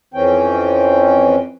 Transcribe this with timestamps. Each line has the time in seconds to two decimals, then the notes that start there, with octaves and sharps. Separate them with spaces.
0.14 F2 E3 C4 C#4 G5